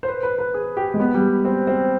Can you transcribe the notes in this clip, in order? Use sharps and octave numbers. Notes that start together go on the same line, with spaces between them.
C5
B4
B4
B4
G#4
G4
G#3
B3
G3
C4
C4